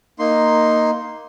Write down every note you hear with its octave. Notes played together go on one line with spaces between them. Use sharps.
A#3 D#4 C6